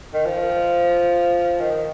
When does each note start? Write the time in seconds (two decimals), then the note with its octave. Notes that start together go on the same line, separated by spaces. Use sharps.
0.14 D#3
0.26 F3
1.60 D#3